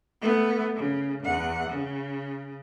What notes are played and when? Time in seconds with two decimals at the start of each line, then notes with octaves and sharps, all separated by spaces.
0.22 A3 B3
0.76 C#3
1.23 E2 F#5
1.69 C#3